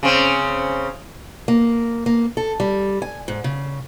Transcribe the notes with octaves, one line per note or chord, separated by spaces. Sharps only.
C#3 C4
A#3
A#3
A4
G3
G#5
G#2
C#3